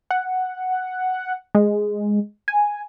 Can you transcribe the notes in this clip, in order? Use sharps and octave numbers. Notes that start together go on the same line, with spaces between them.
F#5
G#3
G#5